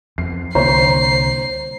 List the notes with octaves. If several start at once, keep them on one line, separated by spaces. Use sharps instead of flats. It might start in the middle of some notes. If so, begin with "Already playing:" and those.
F2 C7
C2 D3 A#3 C5 C#5 A#5 C7